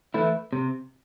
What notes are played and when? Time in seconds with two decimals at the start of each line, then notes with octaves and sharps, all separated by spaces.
0.14 E3 A3 E4
0.53 C3